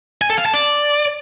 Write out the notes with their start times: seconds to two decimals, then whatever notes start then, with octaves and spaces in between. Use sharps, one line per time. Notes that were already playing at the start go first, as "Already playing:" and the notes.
0.22 G#5
0.30 A4
0.38 F5
0.46 A5
0.54 D5